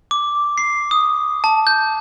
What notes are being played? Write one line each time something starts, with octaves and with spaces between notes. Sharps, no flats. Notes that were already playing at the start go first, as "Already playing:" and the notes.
D6
C7
D#6
A5
G6